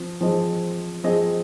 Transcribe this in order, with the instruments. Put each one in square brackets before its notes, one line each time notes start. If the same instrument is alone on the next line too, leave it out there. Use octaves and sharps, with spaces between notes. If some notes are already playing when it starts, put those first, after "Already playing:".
Already playing: [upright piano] F3 C4
F3 C4 G#4 D#5
F3 C4 G#4 D#5